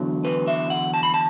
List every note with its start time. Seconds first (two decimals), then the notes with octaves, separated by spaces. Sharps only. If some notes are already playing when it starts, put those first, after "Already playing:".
Already playing: E2 D3 F#3
0.25 B4
0.48 E5
0.70 F#5
0.94 A5
1.03 B5
1.14 A5